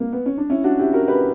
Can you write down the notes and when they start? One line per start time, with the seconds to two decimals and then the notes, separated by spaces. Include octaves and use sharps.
0.00 A#3
0.13 B3
0.26 C#4
0.38 D4
0.49 C#4 E4
0.64 D4 F#4
0.79 E4 G4
0.93 F#4 A#4
1.07 G4 B4